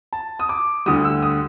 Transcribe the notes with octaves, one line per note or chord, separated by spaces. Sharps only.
A5
D#6
D6
D2 D3 G3 D#6
E6
D#6